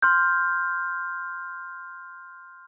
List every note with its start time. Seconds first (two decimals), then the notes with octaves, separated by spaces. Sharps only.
0.02 C6 F6 G6